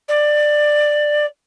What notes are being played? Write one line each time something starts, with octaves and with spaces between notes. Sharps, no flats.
D5